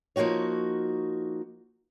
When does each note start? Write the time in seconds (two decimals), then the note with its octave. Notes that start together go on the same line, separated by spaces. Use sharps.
0.16 F3 A#3 D#4 F#4 C#5